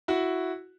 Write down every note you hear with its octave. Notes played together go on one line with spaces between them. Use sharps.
E4 F#4